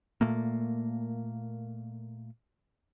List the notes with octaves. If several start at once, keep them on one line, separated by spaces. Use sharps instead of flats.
A#2 A3 A#3